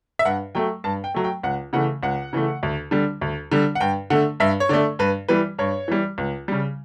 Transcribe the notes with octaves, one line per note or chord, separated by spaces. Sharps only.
E5
G2 F#5
F#3 A3 G5
G2 A5
G5
F#3 A3
G5
C#2 F#5
C#3 E3 A3 F#5
C#2 F#5
C#3 E3 A3
D2
D3 G3
D2
D3 G3
F#5
G2 G5
D3 A3 F#5
G2 E5
C#5
D3 A3 D5
G2 B4
E3 G3 B4
G2 C#5
E3 G3
C#2
C#3 G3